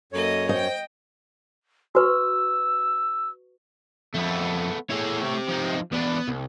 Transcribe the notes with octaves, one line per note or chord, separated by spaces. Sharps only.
F#2 A#3 A4 C#5 D#5
C5 D#5 G5 G6
F#4 B4 C#6 E6
F2 A3 B3
A3 E4 G#4 C#5
C4 G4
F3 D#4
E2 B3 D4
C2